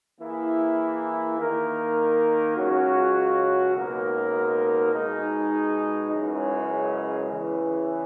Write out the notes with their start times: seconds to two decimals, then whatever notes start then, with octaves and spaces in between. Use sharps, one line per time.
0.20 E3 A#3 E4 G#4
1.37 D#3 A#3 D#4 A#4
2.56 C#2 C#3 F#3 C#4 F#4
3.74 C#2 B2 A#3 D#4 A#4
4.91 B2 G#3 D#4 G#4
6.11 F#2 C#3 E3 G#3
7.28 E2 C#3 E3